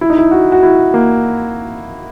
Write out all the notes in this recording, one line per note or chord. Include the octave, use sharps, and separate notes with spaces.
E4
D#4
E4
F#4
F#4
E4
A#3